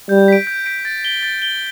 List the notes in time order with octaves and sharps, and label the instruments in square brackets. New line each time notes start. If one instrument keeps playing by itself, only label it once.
[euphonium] G3 [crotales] G6
[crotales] B6 D7
G6
B6 D7
A6
G7
A6
G7